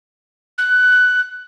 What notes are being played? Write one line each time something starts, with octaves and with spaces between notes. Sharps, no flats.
F#6